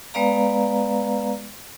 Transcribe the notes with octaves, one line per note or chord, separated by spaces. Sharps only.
G#3 B3 B4 D5 F5 A#5